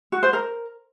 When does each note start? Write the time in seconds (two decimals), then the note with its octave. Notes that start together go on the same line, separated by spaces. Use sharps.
0.12 F#4
0.23 C5
0.33 A#4